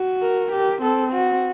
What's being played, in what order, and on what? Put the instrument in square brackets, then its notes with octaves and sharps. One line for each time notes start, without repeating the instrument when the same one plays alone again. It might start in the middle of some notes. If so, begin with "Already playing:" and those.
Already playing: [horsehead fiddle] F#4
[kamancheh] A#4
[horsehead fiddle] G4
[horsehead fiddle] C4 [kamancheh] A4
[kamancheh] F#4